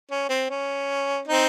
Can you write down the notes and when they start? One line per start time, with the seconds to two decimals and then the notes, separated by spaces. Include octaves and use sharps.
0.11 C#4
0.29 C4
0.50 C#4
1.28 C4 D#4